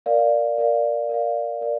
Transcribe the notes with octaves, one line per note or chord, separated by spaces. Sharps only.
A#4 D5 F5
A#4 D5 F5
A#4 D5 F5
A#4 D5